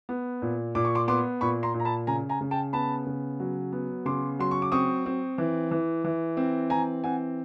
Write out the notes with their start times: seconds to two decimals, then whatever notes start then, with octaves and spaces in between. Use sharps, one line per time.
0.09 B3
0.42 A#2
0.75 A#2 D6
0.85 C#6
0.95 C6 D6
1.08 B3 C6 D6
1.41 A#2 B5 C#6
1.63 A#5 C6
1.74 A#2
1.80 A#5
1.85 A5 B5
2.07 C#3 G#5 A#5
2.29 G#5 A#5
2.41 C#3
2.51 G5 A5
2.73 B3 A5 B5
3.06 C#3
3.40 F#3
3.72 B3
4.05 C#3 C6 D6
4.39 F#3 C6
4.51 C#6
4.62 D6
4.72 C4 C#6 D#6
5.06 C4
5.38 E3
5.71 E3
6.04 E3
6.37 C4
6.70 E3 G#5 A#5
7.04 C4 F#5 G#5